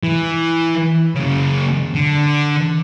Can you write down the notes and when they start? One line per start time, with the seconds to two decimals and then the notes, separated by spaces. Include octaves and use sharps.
0.03 E3
1.16 F#2 C#3
1.95 D3